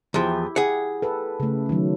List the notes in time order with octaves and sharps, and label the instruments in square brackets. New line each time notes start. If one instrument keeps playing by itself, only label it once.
[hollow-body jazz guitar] E2 F3 [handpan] E4 G4
[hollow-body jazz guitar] G#4 F#5
[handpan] A4 B4
C#3 A3
D#3 F#3